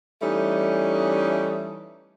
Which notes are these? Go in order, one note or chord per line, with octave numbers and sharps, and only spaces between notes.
E3 G3 A3 C#4 D#4